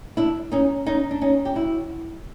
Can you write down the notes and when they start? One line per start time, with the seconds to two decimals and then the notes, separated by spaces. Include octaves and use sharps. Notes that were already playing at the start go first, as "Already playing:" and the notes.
0.17 D4 E4
0.52 C#4 D#4
0.86 C#4 D#4
1.11 D4
1.21 C#4 D#4
1.45 G4
1.55 E4 F#4